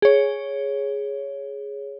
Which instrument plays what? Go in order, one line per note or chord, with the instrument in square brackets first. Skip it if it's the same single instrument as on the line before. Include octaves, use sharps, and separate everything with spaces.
[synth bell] G#4 C#5